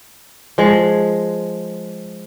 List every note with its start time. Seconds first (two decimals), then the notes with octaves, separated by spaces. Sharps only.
0.58 F3 G#3